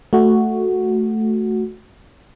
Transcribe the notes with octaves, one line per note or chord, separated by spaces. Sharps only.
A3 F#4